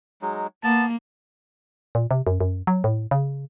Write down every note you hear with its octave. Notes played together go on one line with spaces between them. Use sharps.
F#3 G#3 D#4
A#3 B3 A5
A#2
C3
F#2
F#2
F#3
A2
C#3